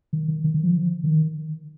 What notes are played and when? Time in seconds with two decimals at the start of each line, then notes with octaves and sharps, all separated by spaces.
0.13 D#3
0.28 D#3
0.44 D#3
0.54 D#3
0.63 F3
1.04 D#3